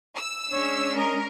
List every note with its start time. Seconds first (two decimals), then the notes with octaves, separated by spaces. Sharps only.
0.16 E6
0.51 G#3 C#4 D4 C#5
0.97 A#4 D#5